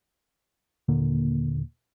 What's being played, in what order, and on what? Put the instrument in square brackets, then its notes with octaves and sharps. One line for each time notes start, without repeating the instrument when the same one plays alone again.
[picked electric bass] D#2 A#2 D3 A#3